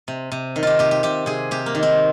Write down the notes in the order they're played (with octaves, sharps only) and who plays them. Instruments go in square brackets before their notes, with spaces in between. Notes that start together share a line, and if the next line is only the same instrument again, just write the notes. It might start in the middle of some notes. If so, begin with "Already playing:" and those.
[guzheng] C3
C3
D#3
F4 G4
C3 G4
G4
C3 G4
C3 G#4
C3 G4
A#3
D#3
C4